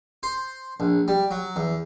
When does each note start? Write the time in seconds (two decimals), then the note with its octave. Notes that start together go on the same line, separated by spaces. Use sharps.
0.23 C5
0.80 A#1
1.08 G3
1.31 F#3
1.56 E2